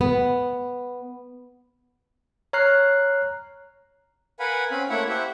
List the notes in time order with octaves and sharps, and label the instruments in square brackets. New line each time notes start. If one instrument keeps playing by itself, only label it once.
[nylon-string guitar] B3
[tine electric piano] C#5 A#5 F6 F#6 C7
[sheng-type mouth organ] A#4 B4 F5 F#5 G#5 B5
C4 C#4 F5 B5
A3 A#3 E4 C#5 E5 F#5
G4 C5 E5 F#5